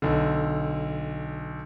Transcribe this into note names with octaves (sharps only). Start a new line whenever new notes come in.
B1 D3